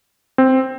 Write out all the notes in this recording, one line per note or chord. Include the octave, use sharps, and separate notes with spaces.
C4